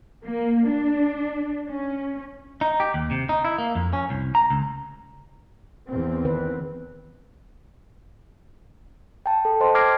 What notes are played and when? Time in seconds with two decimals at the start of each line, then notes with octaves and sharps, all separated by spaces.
0.25 A#3
0.69 D4
1.68 C#4
2.61 D#4
2.80 G4
2.94 D#2
3.11 C3
3.29 D#4
3.45 E4
3.58 A#3
3.75 F2
3.93 C#4
4.10 C2
4.35 A#5
4.50 C#2
5.89 E2 C4
6.25 D#3 B4
9.26 G5 A5
9.45 A4
9.60 C5 D#5 G5 A5 C6
9.75 D6 F6 G#6 A#6 C7 D7